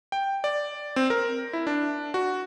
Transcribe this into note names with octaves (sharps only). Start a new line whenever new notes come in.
G5
D5
C4
A#4
E4
D4
F#4